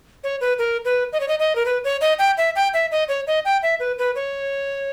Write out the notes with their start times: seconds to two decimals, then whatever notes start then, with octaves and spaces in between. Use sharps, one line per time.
0.24 C#5
0.41 B4
0.59 A#4
0.85 B4
1.13 D#5
1.20 C#5
1.28 D#5
1.39 D#5
1.56 A#4
1.66 B4
1.84 C#5
2.01 D#5
2.19 G5
2.37 E5
2.56 G5
2.74 E5
2.91 D#5
3.08 C#5
3.27 D#5
3.45 G5
3.62 E5
3.80 B4
3.99 B4
4.15 C#5